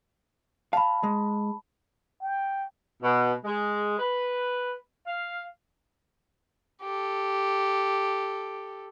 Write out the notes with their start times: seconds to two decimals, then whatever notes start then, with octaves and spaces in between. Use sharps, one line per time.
0.73 F5 A5 B5
1.03 G#3
2.22 G5
3.02 B2
3.45 G#3
3.99 B4
5.06 F5
6.82 G4 A4